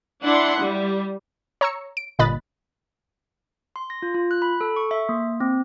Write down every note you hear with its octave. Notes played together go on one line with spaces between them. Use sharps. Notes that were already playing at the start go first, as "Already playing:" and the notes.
D4 E4 F#5 C6
G3
C#5 A#5 C#6 E6 C#7
D7
G1 A#2 D#5 B5 F#6 A6
C6
A#6
F4
F4
F#6
B5
A4
C#6
E5
A#3
C4